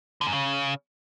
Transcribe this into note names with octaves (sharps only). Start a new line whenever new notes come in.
D3
F#2
C#3